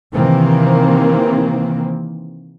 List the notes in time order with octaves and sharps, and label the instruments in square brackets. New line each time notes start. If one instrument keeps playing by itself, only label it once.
[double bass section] C3 D#3 E3 A#3 C4